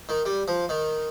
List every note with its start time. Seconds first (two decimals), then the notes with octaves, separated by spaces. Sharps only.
0.09 D#3
0.25 G3
0.48 F3
0.69 D#3